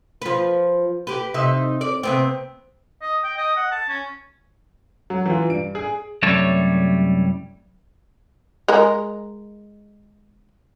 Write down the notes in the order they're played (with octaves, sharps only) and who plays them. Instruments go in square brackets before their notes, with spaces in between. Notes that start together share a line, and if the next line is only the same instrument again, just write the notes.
[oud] F3 B4
G4 B4
C3 D#4 E5
D5
C3 B3 C4
[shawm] D#5
G5
D#5
F#5
A5
C#4
[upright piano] F#3
E3 F4
G2 D7
G#4
[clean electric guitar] C2 F#2 G3 A3 C#5 A5
[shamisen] G#3 A#4